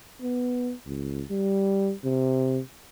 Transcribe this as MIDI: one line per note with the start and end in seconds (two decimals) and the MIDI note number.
0.22 0.73 59
0.86 1.23 37
1.30 1.92 55
2.04 2.59 48